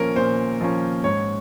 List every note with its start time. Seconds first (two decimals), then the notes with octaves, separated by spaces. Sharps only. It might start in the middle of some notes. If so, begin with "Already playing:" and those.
Already playing: A#2 F3 A#3 C#4 A#4 C#5
0.16 A#2 C5
0.61 F3 A#3 C#4
1.04 G#2 C#5